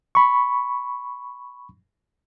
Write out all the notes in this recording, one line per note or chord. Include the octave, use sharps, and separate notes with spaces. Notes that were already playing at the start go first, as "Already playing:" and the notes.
B5 C#6